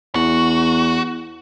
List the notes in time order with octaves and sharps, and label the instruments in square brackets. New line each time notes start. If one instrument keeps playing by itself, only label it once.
[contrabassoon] E2 [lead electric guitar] F#4